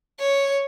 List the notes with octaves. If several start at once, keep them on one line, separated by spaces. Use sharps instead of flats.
C#5